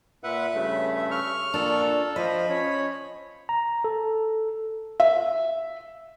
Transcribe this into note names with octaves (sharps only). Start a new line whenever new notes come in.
A#2 B4 E5 F#5
G2 C#3 A3
C#6 F6
A#2 D4 A4 A5
F3 D#5 B5
C#4 C#5
A#5
A4
E5